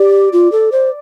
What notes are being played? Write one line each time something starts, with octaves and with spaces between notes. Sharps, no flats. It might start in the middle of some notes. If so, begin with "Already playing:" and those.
Already playing: G4 D5
F4
A4
C5